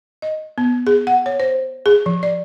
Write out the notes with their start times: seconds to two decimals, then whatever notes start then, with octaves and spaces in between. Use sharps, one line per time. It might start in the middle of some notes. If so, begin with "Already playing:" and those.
0.22 D#5
0.58 B3
0.87 G#4
1.07 F#5
1.26 C#5
1.40 C5
1.86 G#4
2.06 F3
2.23 D5